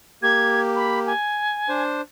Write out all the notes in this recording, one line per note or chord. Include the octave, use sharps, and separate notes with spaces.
A#3 G4 G#6
B5
G#5
D4 C5